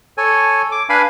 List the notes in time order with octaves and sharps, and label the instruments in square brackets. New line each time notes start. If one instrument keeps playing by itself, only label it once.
[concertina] A4 C#5 G#5
D6
D4 B4 F5 G#5 B5